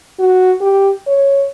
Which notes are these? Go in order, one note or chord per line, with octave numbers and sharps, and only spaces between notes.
F#4
G4
C#5